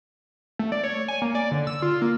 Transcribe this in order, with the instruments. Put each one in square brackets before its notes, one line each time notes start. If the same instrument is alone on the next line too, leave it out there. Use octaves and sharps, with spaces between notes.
[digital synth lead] A3
D5
C#5
G#5
A#3
D5
D3
E6
F4
A#3